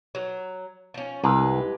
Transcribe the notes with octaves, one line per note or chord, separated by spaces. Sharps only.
F#3
F3 C#4
C2 G#3 G4 B4